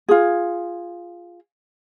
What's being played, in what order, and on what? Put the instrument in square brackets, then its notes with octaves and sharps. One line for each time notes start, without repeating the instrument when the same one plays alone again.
[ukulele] F4 G#4